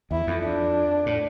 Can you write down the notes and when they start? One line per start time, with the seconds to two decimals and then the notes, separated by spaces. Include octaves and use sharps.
0.11 E2 E4
0.27 F2
0.43 D4
1.06 A2